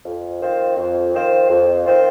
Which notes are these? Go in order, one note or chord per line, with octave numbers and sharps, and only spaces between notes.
F2
D#3 C4 F4 C5
F2
D#3 C4 F4 C5
F2
D#3 C4 F4 C5